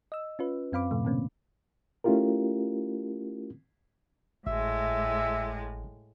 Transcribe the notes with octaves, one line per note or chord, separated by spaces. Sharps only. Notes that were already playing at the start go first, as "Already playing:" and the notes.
D#5 E6
C#4 F4 B4
F#2 C4 F5 B5 D6
A2 C3 F3 A3
B2 D3 A#3 C4 C#4
A3 C#4 E4 F4 G4 A#4
G#1 A2 G#3 E5